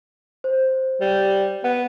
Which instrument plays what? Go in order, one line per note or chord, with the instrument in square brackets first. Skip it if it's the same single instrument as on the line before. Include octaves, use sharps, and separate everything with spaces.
[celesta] C5
[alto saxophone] G3
[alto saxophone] B3 [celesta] F#5